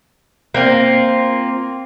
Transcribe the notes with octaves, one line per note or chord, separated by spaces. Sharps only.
A#3 C4 F4